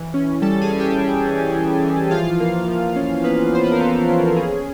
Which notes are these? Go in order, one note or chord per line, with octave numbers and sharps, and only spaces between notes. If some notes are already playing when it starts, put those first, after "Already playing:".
Already playing: E3
C#4
G3 A4 A5
G#4 G#5
C#4
G4 G5
G3
E3
E3
E3
F3 F4 F5
A#3
F3
C#4
A#3 B3 B4
F3 C5
B4
A#4
F3 A4
C#4
C#4 G#4